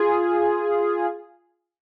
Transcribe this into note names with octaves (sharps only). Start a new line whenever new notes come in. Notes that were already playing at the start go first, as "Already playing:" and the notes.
Already playing: F4 G#4